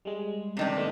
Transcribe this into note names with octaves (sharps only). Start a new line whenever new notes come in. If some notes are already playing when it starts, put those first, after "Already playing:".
G3 G#3
C3 D#3 D4
A2 A3 B3